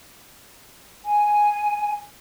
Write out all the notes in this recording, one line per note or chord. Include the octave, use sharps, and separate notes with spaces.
G#5